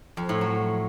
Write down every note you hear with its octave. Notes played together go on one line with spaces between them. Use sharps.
F2
A2
F#3